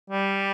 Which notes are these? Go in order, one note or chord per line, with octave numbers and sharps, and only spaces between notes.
G3